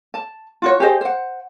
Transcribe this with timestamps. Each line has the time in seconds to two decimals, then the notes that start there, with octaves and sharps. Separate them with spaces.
0.14 A5
0.62 F4 F#4 C#5
0.80 G4 G#4 C5 D#5
1.01 C5 F#5